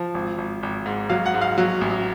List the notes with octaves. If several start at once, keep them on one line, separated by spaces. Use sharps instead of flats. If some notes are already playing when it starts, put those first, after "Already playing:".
Already playing: F3
G#1
G#1
G#1
G#2
F#3 F5
F#5
G#2
F5
F#3
A1